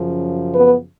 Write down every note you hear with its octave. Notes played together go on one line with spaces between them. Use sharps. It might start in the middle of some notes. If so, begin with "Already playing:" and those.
Already playing: F#2 C#3 F3
B3 B4